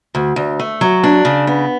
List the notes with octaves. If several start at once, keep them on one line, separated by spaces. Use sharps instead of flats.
D2
D2
A3
F#3
D4
C#3
B3